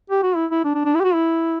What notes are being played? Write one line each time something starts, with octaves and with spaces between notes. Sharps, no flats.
G4
F#4
E4
E4
D4
D4
D4
E4
G4
F#4
E4